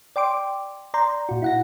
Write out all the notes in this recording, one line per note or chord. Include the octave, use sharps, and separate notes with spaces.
D5 G5 C6 D6
D5 A#5 C6 G6
A#2 F#4
E4 F#5 A#6